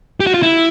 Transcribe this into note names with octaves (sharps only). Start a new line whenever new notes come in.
G4
F#4
F4
E4